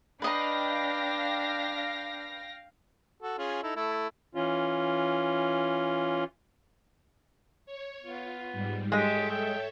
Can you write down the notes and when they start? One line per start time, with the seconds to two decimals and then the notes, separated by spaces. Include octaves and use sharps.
0.22 D4 B4 D#5 F5 G5 A#5 A#6
3.22 F#4 A4
3.38 C#4 F4 G#4
3.63 D#4 E4 A4
3.76 A3 E4 A4
4.35 E3 C#4 F4
7.66 C#5
8.02 B3 F4
8.52 G#2 G3
8.92 G#3 G4 A4 C#5 D#5 E5
9.31 G5